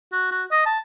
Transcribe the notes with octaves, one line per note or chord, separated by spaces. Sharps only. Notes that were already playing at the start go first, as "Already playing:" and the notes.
F#4
F#4
D#5
A5